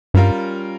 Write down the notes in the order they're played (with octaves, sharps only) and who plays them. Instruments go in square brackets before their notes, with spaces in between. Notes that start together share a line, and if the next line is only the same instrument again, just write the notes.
[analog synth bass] G2 [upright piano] G3 C#4 F4 A#4 F5